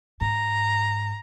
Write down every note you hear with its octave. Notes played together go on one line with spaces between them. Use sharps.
G#2 A#5